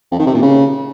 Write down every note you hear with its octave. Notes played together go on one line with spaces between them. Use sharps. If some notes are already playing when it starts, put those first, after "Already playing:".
F2
D#3
C3
A#2
C#3